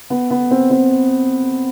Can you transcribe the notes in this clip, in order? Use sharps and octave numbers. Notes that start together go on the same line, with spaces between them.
B3
B3
C4
C4